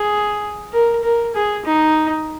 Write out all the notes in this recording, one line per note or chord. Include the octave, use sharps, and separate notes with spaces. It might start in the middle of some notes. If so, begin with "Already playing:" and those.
Already playing: G#4
A#4
A#4
G#4
D#4